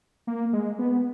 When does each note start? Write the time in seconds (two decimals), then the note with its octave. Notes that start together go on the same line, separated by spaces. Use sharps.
0.27 A#3
0.53 G#3
0.79 B3